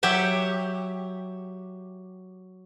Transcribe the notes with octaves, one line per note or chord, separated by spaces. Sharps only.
F#3 G4 E5 F#5